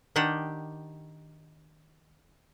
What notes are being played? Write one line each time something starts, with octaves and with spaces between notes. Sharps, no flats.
D#3 D4 G4 F#5 G5